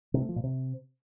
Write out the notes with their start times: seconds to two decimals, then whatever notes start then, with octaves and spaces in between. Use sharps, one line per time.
0.14 C3
0.21 A3
0.29 F3
0.36 A#2
0.44 C3